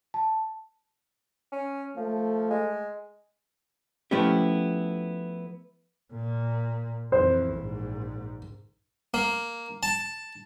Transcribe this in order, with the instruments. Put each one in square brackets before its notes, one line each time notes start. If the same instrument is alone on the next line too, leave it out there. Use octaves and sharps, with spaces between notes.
[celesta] A5
[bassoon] C#4
[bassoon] F3 [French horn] A3
[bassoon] G#3
[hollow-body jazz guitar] F3 A3 B3 C#4 E4 G4
[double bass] A#2
[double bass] F2 E3 [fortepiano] C5
[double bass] A#1 G#2
[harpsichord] A#3
A5